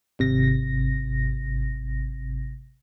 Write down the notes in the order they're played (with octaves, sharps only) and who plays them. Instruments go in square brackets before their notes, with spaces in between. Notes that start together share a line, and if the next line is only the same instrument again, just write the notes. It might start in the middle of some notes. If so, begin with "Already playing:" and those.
[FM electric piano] G#1 C3 A#6